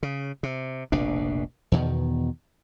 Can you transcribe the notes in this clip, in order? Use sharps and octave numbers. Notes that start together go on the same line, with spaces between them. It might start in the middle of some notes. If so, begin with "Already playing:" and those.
C#3
C3
F1 A#1 B2 D4
E2 B2 D#3